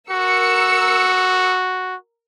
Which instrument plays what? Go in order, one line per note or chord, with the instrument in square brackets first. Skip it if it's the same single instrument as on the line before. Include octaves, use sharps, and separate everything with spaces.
[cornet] F#4 [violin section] A#4 E6 C#7